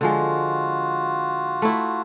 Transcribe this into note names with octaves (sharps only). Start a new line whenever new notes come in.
D3 F3 G#3 F4 F#4
A3 E4